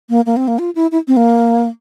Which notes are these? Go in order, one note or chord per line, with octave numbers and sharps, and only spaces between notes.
A#3
A#3
C4
A#3
F4
E4
E4
C4
A#3